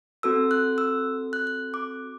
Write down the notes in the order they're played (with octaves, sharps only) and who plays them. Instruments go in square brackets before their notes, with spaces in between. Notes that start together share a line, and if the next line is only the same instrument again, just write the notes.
[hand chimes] C4 F#4 A4 E6
F#6
E6
F#6
F#6
D6